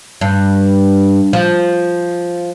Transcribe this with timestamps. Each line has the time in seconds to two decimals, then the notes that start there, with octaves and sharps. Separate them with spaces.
0.21 G2
1.33 F3